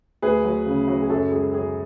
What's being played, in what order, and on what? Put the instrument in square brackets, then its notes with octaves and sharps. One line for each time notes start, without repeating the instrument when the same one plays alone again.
[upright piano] D2 G#4 B4
F#3
C#3
F#3
G#4
F#2 F#4 A4
G#3 G#4
F#2 G#4